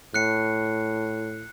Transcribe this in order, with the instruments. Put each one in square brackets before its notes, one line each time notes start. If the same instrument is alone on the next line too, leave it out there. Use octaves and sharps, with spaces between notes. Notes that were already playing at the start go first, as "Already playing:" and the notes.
[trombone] A2 [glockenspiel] F#6 C7 C#7